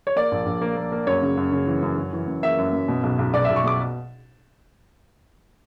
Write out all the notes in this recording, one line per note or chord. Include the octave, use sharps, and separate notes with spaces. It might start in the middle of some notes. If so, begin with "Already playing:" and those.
C#5
A#3 D5
A#1
A#1
A#3
A#3
A#3
F#2 C#5
C#3
F#2
C#3
E3
F#2
F#2
E3
F#2
A#3 E5
F#2
F#2
B2
B1
B1
B1 D5
B1 E5
C#6
B2 D6